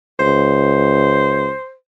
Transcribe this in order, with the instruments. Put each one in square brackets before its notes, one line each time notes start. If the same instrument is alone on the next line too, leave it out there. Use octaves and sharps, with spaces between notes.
[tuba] C#2 [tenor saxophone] C5